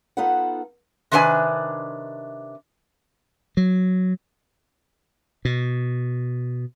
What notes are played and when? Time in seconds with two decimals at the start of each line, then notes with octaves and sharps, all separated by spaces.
0.17 B3 D#4 F4 A4 B4 F#5
1.12 C3 D#3 D4 B4 D5 G#5
3.57 F#3
5.45 B2